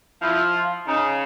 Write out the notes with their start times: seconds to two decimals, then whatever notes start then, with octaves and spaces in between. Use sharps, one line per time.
0.22 F3 E4
0.55 F4
0.87 C#3 D#4